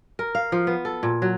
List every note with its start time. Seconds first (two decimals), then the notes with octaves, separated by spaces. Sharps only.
0.19 A#4
0.35 F5
0.52 F3
0.67 B3
0.85 A4
1.03 A#2
1.22 F#3